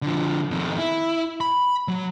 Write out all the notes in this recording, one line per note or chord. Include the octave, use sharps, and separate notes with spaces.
D3 F3
F2 D#3
E4
B5
F#3